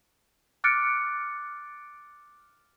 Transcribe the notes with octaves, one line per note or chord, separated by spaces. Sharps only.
D6 F6 F#6 A6 C#7 D7